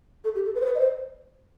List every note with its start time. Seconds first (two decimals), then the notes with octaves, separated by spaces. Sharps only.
0.24 A4
0.35 G4
0.45 A4
0.55 B4
0.61 C5
0.65 B4
0.75 D#5
0.79 C5